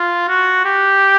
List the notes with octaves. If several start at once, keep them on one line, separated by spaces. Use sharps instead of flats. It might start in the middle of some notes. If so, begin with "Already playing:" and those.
Already playing: F4
F#4
G4